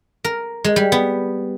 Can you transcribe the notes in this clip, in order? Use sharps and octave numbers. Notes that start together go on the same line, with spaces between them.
A#4
G#3
G3
B3